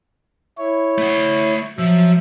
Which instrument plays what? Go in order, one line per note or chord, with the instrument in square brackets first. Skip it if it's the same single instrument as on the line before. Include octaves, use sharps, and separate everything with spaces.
[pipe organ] E4 C#5
[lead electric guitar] A3 F#5
[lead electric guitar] F3 [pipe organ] F#3 E5